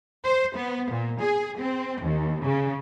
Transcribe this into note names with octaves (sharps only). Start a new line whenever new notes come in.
C5
B3
A#2
G#4
C4
D#2
C#3